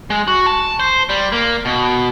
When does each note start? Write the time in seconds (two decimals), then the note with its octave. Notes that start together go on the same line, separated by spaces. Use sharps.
0.10 G#3
0.28 F#4
0.46 A5
0.80 C5
1.09 G3
1.32 A#3
1.65 B2